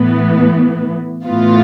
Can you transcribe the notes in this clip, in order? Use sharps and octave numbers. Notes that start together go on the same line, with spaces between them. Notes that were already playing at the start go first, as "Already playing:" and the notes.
Already playing: A2 E3 B3
A2 E3 B3 F4